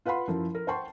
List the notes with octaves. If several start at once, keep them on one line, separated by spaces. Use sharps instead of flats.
F4 B4 F5 F#5 B5 C6
F#2 F3 E4 A#4
A#4
C5 F#5 G5 A5 C6 C#6